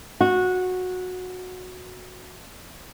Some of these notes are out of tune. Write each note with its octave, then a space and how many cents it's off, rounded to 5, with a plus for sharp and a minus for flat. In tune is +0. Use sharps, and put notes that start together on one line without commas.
F#4 -15